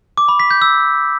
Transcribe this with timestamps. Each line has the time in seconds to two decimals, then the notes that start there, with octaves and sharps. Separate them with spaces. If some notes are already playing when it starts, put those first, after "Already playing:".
0.18 D6
0.29 B5
0.40 B6
0.51 G6
0.62 E6